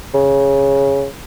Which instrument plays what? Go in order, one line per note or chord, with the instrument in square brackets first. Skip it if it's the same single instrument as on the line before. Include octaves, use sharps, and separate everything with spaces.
[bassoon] C#3